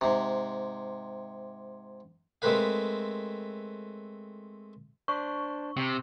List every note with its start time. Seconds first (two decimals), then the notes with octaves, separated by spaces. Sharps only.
0.01 G#2 C3
2.42 G#3 A3 C4 A#4 B4 F5
5.08 D4 C5 C#6
5.77 C3